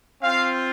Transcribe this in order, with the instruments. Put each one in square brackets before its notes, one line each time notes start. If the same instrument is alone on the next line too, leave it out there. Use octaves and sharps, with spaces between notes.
[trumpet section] C4 F4 F5